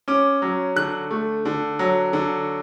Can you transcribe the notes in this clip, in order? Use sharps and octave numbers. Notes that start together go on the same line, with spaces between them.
C#4 D6
F#3
D3 F#6
A3
D3
F#3
D3